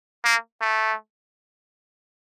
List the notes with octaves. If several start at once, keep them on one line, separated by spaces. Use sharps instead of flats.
A#3
A3